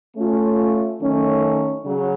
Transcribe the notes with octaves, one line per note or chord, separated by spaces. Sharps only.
A3 C#4 F4
D#3 F#3 A3 C#4
C#3 F#3